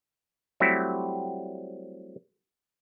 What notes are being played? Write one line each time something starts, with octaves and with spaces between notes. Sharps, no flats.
F#3 G3 A3 C4 E4 G4